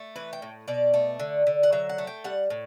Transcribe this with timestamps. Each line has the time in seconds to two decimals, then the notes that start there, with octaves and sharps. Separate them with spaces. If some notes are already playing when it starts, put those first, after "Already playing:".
Already playing: A3
0.16 E3 B4
0.33 G5
0.42 A2
0.68 B2 D5
0.94 A3
1.20 D3
1.47 D3
1.63 F#5
1.72 F#3 E5
1.89 F#5
1.98 A3
2.07 G5
2.24 G3 F#5
2.50 A2